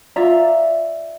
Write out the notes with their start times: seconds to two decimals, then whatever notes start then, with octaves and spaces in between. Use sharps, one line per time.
0.16 F4 D5 E5 A#5